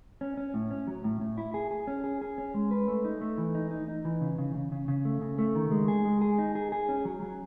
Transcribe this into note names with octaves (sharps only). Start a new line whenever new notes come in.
C#4
C#4
A2
C#4
F#3
A2
A2
E4
G#4
G#4
C#4
G#4
G#4
C#4
G#3
B4
A3
D#4
A3
E3
D#4
D#4
D#4
E3
C#3
C#3
C#3
C#3
C#3
A3
C#3
A3
D#3
G#3
G#4
G#3
G#4
D#4
G#4
G#4
C#4
F#3
F#3